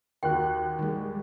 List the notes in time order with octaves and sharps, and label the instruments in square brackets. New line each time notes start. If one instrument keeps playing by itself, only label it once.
[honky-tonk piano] D#2 F#4 F#6 [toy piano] G5
[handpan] D#3 G#3 [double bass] G3